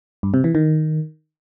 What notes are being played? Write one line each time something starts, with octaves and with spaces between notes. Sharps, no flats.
G2
C3
E3
D#3